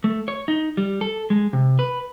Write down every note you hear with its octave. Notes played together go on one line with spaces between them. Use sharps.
A3
C#5
D#4
G3
A4
G#3
C3
B4